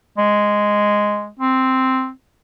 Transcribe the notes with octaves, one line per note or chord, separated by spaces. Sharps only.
G#3
C4